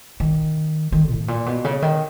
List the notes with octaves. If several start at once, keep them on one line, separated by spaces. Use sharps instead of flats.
D#3
D#3
A2
A#2
B2
C#3
D#3